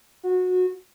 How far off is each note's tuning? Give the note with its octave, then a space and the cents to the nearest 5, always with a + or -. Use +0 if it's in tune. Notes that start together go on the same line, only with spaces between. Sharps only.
F#4 -20